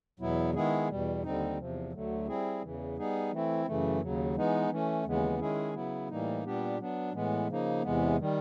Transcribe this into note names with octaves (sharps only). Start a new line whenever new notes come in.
E2 B2 F#3 B3 E4
D#3 G#3 B3 E4 G#4
E2 B2 G3
D#2 D3 G3 C4 D#4
E2 C3 F3
D2 D3 F#3 A3
G3 C4 E4 G#4
E2 C#3 E3
G3 B3 D#4 G#4
E3 A3 C4 E4
F#2 C#3 E3 A3
D#2 C#3 F#3
E3 G#3 B3 D#4
E3 A3 C#4
D#2 C#3 E3 G#3 B3
D#3 G#3 C#4 E4 G#4
C#3 F#3 B3 E4
A2 E3 G3 A#3 D#4
A#2 G3 B3 D4 G4
F#3 B3 D4
A2 E3 G#3 B3
C#3 F3 A#3 D#4
E2 C3 E3 G#3 B3
D#3 G3